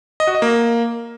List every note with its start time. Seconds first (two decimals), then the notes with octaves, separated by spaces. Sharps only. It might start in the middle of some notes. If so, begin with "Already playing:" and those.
0.20 D#5
0.27 F#4
0.35 D#5
0.42 A#3